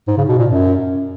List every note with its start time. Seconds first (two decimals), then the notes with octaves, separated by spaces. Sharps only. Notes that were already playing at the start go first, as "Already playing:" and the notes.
0.08 G#2
0.17 C#3
0.29 B2
0.39 A#2
0.49 F#2